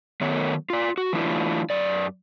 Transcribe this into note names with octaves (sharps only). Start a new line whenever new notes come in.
D#3 F#3 A3 B3 C#5
F4 D5
F#4
E3 F#3 A3 D4 E4 F4
F#2 D5